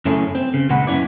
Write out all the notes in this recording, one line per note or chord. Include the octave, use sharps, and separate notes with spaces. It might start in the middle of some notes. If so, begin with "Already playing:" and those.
F#2 C#3 A3 C#4 E4 G#4
C4
C#3
C#2 A#2 C#3 G#3 F#5 B5
F#2 B3 C#4 E4 C#5 D5